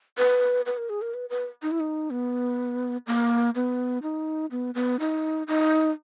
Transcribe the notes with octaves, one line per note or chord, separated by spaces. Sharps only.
B4
B4
A#4
G#4
A#4
B4
B4
D#4
E4
D#4
B3
A#3
B3
D#4
B3
B3
D#4
D#4